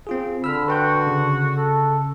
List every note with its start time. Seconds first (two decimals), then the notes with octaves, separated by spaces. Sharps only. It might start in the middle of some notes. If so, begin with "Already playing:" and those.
0.07 C4 F4 G#4
0.44 D3 B5 E6 F6
0.68 F#4 B4 G5 G6
1.07 C#3
1.56 A4